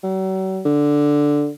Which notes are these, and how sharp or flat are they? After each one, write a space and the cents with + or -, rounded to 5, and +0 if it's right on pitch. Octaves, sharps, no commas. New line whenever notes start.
F#3 +45
D3 +0